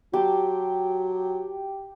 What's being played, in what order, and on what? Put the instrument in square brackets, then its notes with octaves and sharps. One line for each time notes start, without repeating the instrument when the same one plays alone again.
[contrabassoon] F#3 [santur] G4 A5 C6